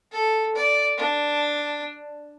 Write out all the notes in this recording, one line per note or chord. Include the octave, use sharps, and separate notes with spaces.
A4
D5
D4